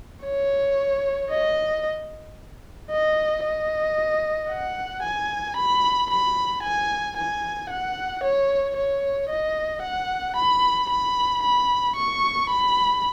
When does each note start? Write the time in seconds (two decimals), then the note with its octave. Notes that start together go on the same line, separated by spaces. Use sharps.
0.24 C#5
1.31 D#5
2.91 D#5
3.44 D#5
4.50 F#5
5.03 G#5
5.57 B5
6.10 B5
6.63 G#5
7.17 G#5
7.70 F#5
8.24 C#5
8.77 C#5
9.30 D#5
9.83 F#5
10.37 B5
10.90 B5
11.43 B5
11.96 C#6
12.50 B5